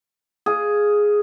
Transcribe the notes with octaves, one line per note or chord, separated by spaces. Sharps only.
G#4 F5